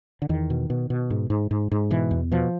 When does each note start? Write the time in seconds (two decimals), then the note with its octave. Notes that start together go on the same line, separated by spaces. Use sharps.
0.22 D3
0.29 E2 D#3
0.50 B2
0.70 B2
0.90 B2
1.10 G#2
1.30 G#2
1.51 G#2
1.71 G#2
1.90 B2 E3
2.11 E2
2.31 B2 F3